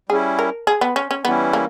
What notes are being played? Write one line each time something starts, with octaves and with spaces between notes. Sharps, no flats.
G3 C#4 E4 G#4
A#4
G#4
B3
C#4
C#4
E3 G3 B3 C#4 E4
A#3